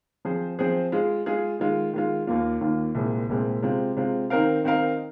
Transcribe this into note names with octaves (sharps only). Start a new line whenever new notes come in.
F3 C4 G#4 C5
F3 C4 G#4 C5
G#3 F4 G#4
G#3 F4 G#4
D#3 G#3 F4
D#3 G#3 F4
D#2 D#3 A#3 F4
D#2 D#3 A#3 F4
C2 A#2 G#3 C4
C2 A#2 G#3 C4
C3 G#3 C4 F4
C3 G#3 C4 F4
D#3 C4 D#4 A#4 F5
D#3 C4 D#4 A#4 F5